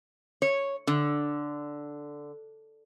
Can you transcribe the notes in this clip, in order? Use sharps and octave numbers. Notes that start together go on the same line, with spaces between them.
C#5
D3